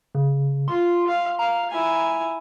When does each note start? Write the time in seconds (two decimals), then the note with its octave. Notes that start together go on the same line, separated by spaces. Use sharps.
0.15 C#3
0.68 F4 C6
1.07 F5
1.39 F5 A#5
1.71 E4 G#5